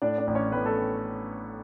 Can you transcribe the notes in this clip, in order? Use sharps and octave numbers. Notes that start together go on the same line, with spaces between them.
A2 D4 D5
D4 D5
A1
C#4 C#5
A2 B3 B4
A3 A4